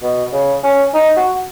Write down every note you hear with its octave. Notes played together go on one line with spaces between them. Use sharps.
B2
C#3
C#4
D#4
F#4